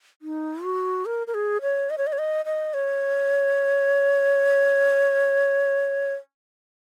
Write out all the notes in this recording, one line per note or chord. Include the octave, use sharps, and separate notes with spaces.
D#4
F#4
A#4
A#4
G#4
C#5
D#5
C#5
D#5
C#5
D#5
D#5
C#5